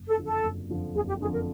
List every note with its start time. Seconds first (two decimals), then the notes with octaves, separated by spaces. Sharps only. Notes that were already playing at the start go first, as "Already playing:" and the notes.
Already playing: F#1
0.08 A4
0.17 F2 D3 F3
0.25 A4
0.43 F#1
0.69 F2 D3 F3
0.94 F#1 G#4
1.08 G4
1.21 F2 D3 F3 G#4
1.33 A#4